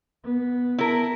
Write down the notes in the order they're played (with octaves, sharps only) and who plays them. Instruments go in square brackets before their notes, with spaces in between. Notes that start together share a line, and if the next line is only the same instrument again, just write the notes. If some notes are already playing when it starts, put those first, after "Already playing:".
[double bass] B3
[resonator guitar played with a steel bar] E4 A#4